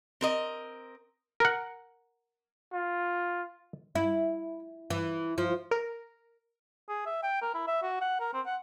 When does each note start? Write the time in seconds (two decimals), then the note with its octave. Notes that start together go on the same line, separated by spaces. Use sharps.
0.21 C4 A#4 D#5
1.40 A#4 F#5
2.72 F4
3.95 E4
4.90 E3
5.38 F3
5.71 A#4
6.89 G#4
7.06 E5
7.23 G5
7.42 A#4
7.54 E4
7.67 E5
7.82 F#4
8.01 F#5
8.20 A#4
8.33 C4
8.46 F#5